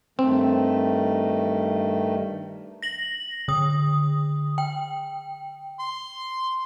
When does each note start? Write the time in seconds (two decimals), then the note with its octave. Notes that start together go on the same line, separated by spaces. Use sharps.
0.19 G2 D#3 A3 C4
2.82 A#6 F#7
3.48 D3 D#6
4.58 G5
5.79 C6